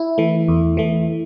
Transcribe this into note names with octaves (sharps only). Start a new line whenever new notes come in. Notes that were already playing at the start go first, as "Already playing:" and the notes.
Already playing: E4
E3 A3
E2
E3 A3